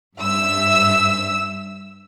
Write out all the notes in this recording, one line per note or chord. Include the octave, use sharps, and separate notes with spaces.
G2 E5 E6